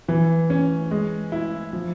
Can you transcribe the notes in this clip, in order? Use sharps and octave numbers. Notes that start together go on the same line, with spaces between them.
E3
C#4
G#3
E4
F3